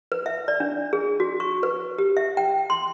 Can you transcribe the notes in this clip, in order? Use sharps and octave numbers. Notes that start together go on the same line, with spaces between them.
B4
E5
D5
D4
G#4
F#4
C#6
B4
G4
E5
G5
C6